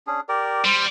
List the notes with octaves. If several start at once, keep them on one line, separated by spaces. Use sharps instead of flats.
C#4 D4 G#4
G4 A#4 D5
G3 C5